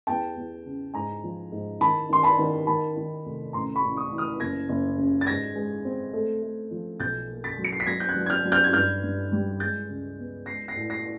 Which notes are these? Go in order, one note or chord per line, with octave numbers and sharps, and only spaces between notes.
E2 G5 A5
E2
C#3
G#2 G#5 A#5
F3
G#2
D#3 A5 B5
D#3 C6
A5 B5
D#3
D#3 A5 B5
D#3
F1
A1 A#5 C6
B5 C#6
A1
C#6 D#6
E3
D#6 F6
F#1 G#6 A#6
F#1
C#3
A6
G#2 G#6 A#6
G#3
C4
A3
A3
F3
B1 G6 A6
A#3
A6 B6
F#3
C#7
C7
B6
F#3 G#6 A#6
G6
F#6 G#6
F#3
G#6
F6 G6
F#3
F6 G6
G#6
G2 F6 G6
G2
G3
G#3 G6 A6
C#2
B3
G#3 A#6 C7
A#6 C7
A2
A#6 C7